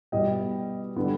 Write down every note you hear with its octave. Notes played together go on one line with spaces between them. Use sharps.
B2 G3 B3 D#5 G5
D3 G3 B3